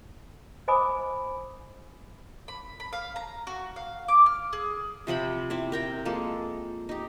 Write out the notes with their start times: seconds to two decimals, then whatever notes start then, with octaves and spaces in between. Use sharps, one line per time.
0.68 C5 D#5 G#5 B5 D6 D#6
2.48 B5
2.80 B5
2.93 F5
3.16 A#5
3.47 F#4
3.76 F5
4.08 D6
4.26 F6
4.53 G#4
5.07 C3 F3 G5 B5
5.50 C4 E4 D5
5.72 A#4 G5 A#5
6.05 F3 G#3 A#3 A4
6.89 D#4 G4